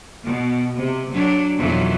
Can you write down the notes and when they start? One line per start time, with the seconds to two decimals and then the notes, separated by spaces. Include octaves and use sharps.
0.25 B2
0.74 C3
1.10 F#3 D4
1.57 F2 B2 D#3 E3 F#3